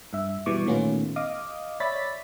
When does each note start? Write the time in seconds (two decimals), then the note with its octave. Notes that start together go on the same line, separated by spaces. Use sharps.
0.13 G2 E5
0.46 B2 E3 G3 C#6 D6
0.66 A#2 D#3 A3 B3 C#4 F4
1.16 D#5 F5 D6 D#6
1.80 C#5 D5 E5 B5 A6 B6